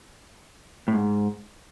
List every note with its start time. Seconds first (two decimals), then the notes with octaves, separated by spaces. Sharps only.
0.88 A2
0.94 G#2